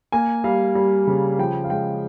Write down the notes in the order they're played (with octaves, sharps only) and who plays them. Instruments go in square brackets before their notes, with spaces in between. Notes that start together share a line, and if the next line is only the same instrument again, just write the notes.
[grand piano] A#3 G#5
G3 F5
G3
C#3
F3 G5
F5
G#3 G5